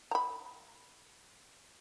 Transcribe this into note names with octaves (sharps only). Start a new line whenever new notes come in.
A#5 B5